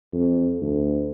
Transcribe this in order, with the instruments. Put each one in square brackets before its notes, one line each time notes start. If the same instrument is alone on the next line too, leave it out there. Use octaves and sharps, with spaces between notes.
[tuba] F2
D2